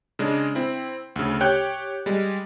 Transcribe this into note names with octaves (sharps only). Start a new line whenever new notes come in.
C#3 G#3 D4
C4 E4
D2 C#3
G4 C#5 G5 F#6 G6
G3 G#3